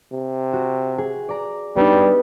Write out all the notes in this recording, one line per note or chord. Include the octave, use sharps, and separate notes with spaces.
C3
F#4
G#4
D5 A#5
G3 B3 D4 D#4